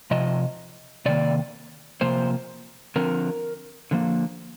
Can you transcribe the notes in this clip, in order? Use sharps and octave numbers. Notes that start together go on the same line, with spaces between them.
C3 F3 D#5
C3 D#3 A#3 D5
C3 F3 A#3 C5
D3 F3 C4 A#4
D3 F3 A#3